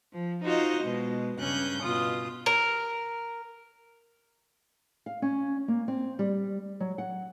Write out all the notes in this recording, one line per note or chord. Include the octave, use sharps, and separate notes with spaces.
F3
D#4 F4 F#4 C5 D#5
B2 G#3
G2 C#3 C#4 F#6 G6
B2 F4 D#6
A#4
F5
C#4
A#3
C4
G3
F#3
F#5